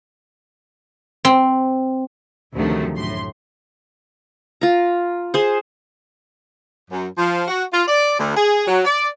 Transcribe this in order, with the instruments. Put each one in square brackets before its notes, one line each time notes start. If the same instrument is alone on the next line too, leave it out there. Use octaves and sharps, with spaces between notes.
[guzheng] C4
[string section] D2 C3 D#3 F3 F#3 A3
F#2 A2 C6
[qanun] F4 A#5
G#4 C5
[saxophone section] F#2
F3
F#4
F4
D5
D2
G#4
F#3
D5